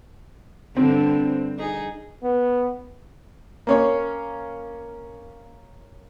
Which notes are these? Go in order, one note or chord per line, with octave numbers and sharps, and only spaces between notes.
G2 D3 C4
D#4 G#4
B3
A#3 C#4 C#5